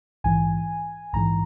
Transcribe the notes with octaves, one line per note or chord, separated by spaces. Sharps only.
A#1 G#2 E3 G#5
A#1 G#2 E3 A#5